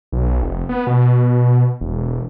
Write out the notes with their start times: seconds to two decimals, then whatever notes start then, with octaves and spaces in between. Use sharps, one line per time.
0.12 B1
0.43 F1
0.69 B3
0.87 B2
1.81 E1